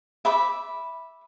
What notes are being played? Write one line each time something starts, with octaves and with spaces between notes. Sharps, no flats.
E5 B5 D6